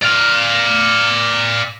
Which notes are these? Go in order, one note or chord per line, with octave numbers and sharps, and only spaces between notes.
D5 F5